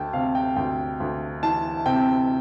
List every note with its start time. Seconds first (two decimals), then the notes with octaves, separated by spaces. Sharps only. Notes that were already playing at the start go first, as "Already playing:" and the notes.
Already playing: D2 G5 A5
0.13 C3 F5
0.35 G5
0.56 D2 G5
1.00 D2
1.43 E3 A5
1.86 C3 G5